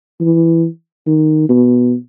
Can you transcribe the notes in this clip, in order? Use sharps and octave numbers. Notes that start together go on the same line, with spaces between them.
E3
D#3
B2